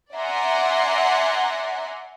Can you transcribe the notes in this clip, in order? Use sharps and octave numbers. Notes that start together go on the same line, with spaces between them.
D5 E5 F#5 G#5 A#5 C6